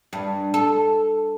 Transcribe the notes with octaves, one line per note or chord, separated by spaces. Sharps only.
G2
A4